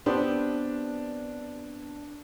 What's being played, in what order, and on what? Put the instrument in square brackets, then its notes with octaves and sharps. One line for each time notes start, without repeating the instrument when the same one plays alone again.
[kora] B3 C4 G4 [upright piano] D4